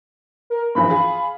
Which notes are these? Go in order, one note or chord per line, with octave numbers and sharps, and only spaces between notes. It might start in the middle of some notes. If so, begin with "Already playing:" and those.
A#4
G2 E3 F3 B5
F4 G#4